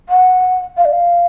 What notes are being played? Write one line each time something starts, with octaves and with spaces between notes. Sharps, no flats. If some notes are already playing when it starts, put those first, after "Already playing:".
F#5
F5
D5
F5